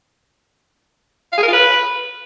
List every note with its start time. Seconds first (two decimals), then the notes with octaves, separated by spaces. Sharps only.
1.33 F5
1.38 G#4
1.43 A#4
1.48 F4
1.53 B4